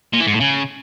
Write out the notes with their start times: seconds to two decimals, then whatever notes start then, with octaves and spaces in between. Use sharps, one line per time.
0.13 A#2
0.20 E3
0.27 G#2
0.34 A2
0.40 C#3